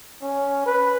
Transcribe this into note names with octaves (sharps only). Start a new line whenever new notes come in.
C#4
B4